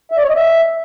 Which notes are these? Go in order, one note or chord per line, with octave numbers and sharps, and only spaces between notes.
E5
D5
C#5
D#5
E5